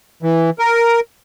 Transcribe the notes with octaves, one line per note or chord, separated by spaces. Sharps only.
E3
A#4